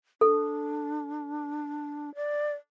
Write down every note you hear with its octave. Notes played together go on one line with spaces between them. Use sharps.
D4 A4
D5